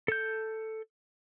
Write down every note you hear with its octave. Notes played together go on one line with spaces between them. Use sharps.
A4 G6